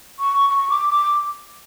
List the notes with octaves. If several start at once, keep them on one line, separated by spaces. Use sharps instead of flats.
C#6
C#6
D6
D6